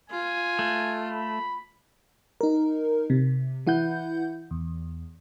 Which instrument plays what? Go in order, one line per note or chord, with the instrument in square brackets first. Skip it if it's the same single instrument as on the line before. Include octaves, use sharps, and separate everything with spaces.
[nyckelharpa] F4 [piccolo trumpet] G#5
[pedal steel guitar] A3
[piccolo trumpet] B5
[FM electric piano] D#4 A#4
C3
E3 E4 F#5 G6
E2